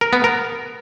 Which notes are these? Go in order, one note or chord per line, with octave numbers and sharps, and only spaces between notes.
A#4
B3
A#4